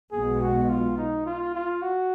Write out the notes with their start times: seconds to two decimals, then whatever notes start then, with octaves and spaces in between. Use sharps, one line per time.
0.12 B1 B2 G#3 B3 G#4
0.41 F#4
0.69 F4
0.97 D#4
1.26 F4
1.54 F4
1.82 F#4